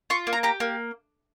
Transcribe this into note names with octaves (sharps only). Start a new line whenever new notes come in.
F4 C#6
A#3
A#5
G4 A#5
A#3